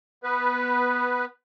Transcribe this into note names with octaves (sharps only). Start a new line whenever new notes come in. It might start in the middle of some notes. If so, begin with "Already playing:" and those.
B3 B4